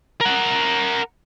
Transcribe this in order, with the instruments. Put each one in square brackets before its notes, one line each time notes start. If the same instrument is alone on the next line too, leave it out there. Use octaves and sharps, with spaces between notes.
[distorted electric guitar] A#4 F#5